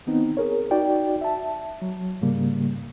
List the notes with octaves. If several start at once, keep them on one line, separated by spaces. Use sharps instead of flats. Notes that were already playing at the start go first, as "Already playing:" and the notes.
D#3 B3 C4 D#4
G#4 A#4 C#5
D#4 F#4 D5 G5
E5 A5
F#3
G#2 C#3 G3 A#3